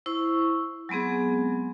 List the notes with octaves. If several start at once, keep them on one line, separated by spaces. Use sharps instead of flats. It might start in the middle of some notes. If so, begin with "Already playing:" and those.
E4 C5 C#6 E6
F#3 G#3 B3 C4 G#4